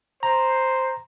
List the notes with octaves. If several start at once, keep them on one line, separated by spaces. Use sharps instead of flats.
C5 A#5